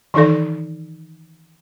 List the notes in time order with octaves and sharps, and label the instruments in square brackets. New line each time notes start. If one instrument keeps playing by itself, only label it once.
[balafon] D#3 E3 D#4 A4 D5